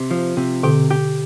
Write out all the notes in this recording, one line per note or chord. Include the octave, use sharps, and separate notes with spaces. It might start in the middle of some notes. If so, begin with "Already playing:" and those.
Already playing: C3
F3
C3
B2 D3 G4
G4